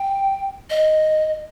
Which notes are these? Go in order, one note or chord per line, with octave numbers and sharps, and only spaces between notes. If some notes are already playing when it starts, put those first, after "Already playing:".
Already playing: G5
D#5